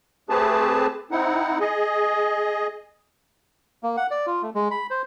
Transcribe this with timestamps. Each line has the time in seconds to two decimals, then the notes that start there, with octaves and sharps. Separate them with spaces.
0.29 A3 C4 G4 G#4 B4 A5
1.11 C4 D#4 E4 F#5
1.60 G#4 D#5
3.83 A#3
3.97 F#5
4.11 D5
4.27 F4
4.42 A3
4.55 G#3
4.71 B5
4.90 C5